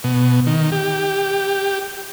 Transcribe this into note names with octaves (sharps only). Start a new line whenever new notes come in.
B2
D#3
G4